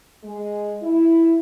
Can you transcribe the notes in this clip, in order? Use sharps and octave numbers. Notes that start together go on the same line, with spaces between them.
G#3
E4